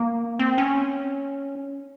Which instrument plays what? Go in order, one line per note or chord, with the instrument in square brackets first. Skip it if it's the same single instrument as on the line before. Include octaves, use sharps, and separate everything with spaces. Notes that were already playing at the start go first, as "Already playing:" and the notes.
Already playing: [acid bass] A#3
C4
C#4